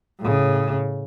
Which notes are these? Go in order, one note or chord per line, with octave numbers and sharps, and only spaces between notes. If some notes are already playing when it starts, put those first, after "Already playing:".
A2 C#3